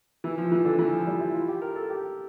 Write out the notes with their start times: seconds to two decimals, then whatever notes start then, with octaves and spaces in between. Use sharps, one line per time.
0.24 E3
0.38 F3
0.52 E3
0.65 D3
0.79 E3
0.93 F3
1.07 G3
1.20 E4
1.34 F4
1.48 G4
1.62 A#4
1.75 A4
1.90 G4